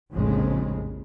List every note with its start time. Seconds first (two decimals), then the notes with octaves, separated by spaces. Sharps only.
0.11 F1 A#1 F2 A2 C#3 G#3